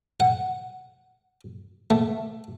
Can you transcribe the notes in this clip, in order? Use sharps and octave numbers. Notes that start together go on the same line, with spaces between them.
F#5
A3